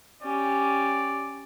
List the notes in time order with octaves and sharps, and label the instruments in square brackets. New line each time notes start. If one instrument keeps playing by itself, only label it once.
[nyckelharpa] C#4 G4 [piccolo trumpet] D5